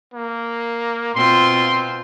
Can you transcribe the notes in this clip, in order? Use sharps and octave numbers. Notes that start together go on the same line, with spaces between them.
A#3
B2 C4 F4 C6